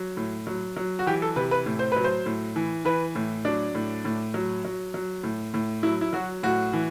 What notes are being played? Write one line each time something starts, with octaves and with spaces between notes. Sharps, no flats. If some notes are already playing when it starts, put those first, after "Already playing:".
Already playing: F#3
A2
F#3
F#3
F#4
E3 G4
A4
C3 B4
B4
A2
C5
F#3 B4
C5
A2
E3
E3 B4
A2
F#3 D4
A2
A2
F#3
F#3
F#3
A2
A2
F#3 E4
E4
F#3 F#4
A2 F#4
E3